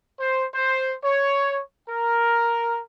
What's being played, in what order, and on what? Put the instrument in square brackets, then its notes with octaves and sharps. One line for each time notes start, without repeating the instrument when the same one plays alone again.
[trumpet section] C5
C5
C#5
A#4